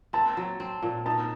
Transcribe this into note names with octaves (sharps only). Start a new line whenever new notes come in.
C4 A5
F#3
C4
A#2
D#4 A5